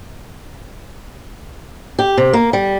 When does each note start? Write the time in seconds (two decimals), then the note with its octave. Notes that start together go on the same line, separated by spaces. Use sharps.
1.99 G4
2.17 C3
2.33 A#3
2.53 G3